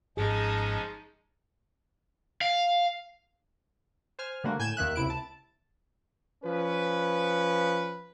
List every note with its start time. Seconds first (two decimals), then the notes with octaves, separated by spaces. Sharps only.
0.17 G#1 G#2 F3 G#3 C#4 D#4 G#4 A5
2.41 F5
4.19 C5 G#5 F6
4.44 D3 G3 A3 A#3 F#4
4.59 A2 G#5 G6 G#6 E7
4.77 D#2 D#3 E5 F#6
4.96 C#2 C3 E4 D7
5.10 A5
6.45 F3 C#4 B4